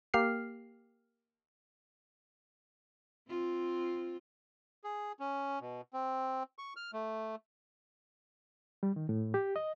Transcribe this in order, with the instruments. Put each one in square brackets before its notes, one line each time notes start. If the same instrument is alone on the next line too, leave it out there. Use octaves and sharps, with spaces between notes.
[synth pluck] A#3 G4 F6 C7
[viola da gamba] C4 F4
[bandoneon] G#4
C#4
B2
C4
C#6
F6
A3
[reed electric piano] G3
D#3
A2
G4
D#5